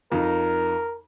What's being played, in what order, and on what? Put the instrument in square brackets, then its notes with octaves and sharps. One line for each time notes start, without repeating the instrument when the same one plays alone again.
[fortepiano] F2 D#4 [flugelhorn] A#4